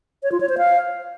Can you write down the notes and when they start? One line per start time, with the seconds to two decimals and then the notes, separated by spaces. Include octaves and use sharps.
0.23 C#5
0.32 F4
0.40 C#5
0.49 C5
0.58 F5